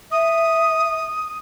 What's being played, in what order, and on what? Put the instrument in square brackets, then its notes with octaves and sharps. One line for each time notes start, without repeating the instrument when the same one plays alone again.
[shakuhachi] E5 [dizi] D#6